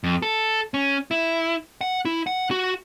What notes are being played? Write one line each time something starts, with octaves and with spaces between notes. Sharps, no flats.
F2
A4
C#4
E4
F#5
E4
F#5
F#4